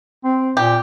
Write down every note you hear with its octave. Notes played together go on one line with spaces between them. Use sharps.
C4
A#2 G4